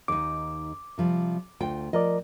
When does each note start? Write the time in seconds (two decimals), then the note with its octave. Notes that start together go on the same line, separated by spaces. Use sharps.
0.08 D#2 D#4 D6
0.98 C3 F3 G3
1.60 D2 F4 G5
1.93 F3 A#4 D5 D#5